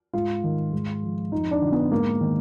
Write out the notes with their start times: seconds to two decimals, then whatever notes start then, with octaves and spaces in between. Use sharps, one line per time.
0.14 G#2 F4
0.44 D#3
0.73 G#2
1.03 F3
1.32 F2 D#4
1.51 D4
1.61 D3 F3
1.72 B3
1.92 G#2 A#3
2.21 D#3